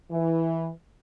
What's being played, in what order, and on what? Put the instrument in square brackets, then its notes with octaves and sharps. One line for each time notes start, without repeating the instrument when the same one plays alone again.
[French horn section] E3